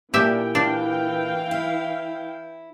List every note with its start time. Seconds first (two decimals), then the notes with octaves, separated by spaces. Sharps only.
0.14 A#2 E3 A#3 D4 G4 E5 G5
0.55 D4 F5
1.51 E4